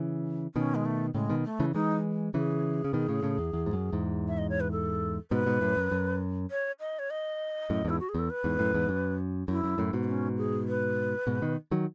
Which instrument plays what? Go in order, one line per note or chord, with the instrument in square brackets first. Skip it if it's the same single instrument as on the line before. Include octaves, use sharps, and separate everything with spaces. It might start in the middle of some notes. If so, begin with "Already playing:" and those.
Already playing: [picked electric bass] C#3 E3
[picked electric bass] B2 D#3 [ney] C#4
[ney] G#3
A3
[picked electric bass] A2 C#3 [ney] G#3
[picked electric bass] B2 D#3
[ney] A3
[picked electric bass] C#3 E3
[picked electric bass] E3 G#3 [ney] D#4
[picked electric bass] C#3 E3 [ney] G#4
[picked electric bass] C#3
B2 D#3
A2 C#3
A2 C#3
E2
E2
G#2
F#2
E2 G#2
[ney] E5
D#5
C#5
B4
A4
[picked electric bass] G#2 B2 [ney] B4
[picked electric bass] G#2 B2
F#2 A2
F#2
F#2
[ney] C#5
D#5
C#5
D#5
[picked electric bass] F#2 A2
[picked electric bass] E2 G#2 [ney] E4
[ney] F#4
G#4
[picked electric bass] E2 [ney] A4
[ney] B4
[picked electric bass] E2 G#2
F#2 A2
E2 G#2
F#2
[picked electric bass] F#2 [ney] E4
[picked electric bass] F#2
F#2 A2
G#2 B2
[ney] B3
C#4
G#4
B4
[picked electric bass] G#2 B2
B2 D#3
D#3 F#3